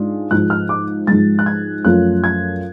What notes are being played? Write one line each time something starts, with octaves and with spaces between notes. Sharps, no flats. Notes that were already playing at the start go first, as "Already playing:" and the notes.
Already playing: G#2 G#3 D4 F4
G#2 F3 G#3 F#6
F6
D6
G#2 F3 G#3 A6
F#6
G#6
F#2 F3 A3 C#4 F4 F#6
G#6